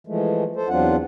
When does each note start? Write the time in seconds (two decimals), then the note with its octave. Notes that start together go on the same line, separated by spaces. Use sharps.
0.07 E3 F3 G#3 A3
0.56 A4 C5
0.69 E2 F#3 C4 D4 F4 F#5